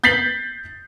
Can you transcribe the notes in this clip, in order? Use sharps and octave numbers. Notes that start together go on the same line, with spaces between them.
G6 A6 B6 C7 F#7